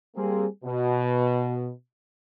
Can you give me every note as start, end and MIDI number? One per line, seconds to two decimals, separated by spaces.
0.16 0.46 55
0.16 0.46 58
0.16 0.46 60
0.16 0.46 68
0.65 1.69 47